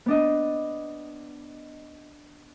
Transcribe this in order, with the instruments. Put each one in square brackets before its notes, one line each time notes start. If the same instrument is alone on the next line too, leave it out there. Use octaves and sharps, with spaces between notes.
[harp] B3 D4 D#5